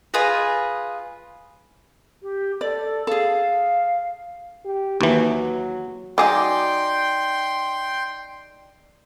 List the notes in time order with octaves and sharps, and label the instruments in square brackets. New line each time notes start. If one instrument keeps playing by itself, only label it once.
[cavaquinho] F4 G#4 B4 D#5
[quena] G4
[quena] A4 [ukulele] D5
[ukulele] G#4 A4 [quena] F5
[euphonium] G4
[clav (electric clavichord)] D#2 E3 [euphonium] F#3
[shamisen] F#3 G#4 [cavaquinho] D#4 D5 D6 [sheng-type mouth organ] G5 C6